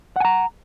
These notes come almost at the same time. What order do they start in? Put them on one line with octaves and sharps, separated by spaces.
F#5 G#5 A#5